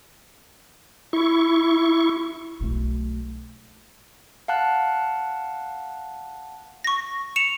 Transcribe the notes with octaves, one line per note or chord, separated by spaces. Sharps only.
E4 C#6
B1 A3
F5 F#5 A5 F#6
C#6 A#6
C#7 E7 F7